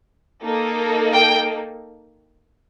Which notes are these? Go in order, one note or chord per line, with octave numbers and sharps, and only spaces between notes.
A#3 D#4 A4
G5